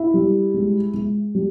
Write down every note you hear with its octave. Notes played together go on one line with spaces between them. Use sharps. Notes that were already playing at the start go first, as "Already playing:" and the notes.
Already playing: E4
G3
G#3
G#3
G3